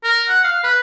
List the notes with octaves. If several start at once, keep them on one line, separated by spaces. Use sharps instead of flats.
A#4
F#5
F5
B4